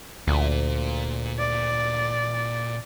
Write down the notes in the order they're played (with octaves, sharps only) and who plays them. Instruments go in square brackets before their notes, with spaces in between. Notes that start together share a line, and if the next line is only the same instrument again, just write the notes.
[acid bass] D2 [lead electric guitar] A#2 F4
[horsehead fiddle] D5